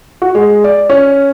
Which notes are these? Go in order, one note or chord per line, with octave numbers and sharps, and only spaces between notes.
F#4
G#3
D5
C#4